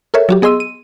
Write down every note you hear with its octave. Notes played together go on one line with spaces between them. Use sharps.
A4 A#4 C#5 E5
F#3 F#4 G4
B3 G#4 D#5 C6 E6 D#7
D#7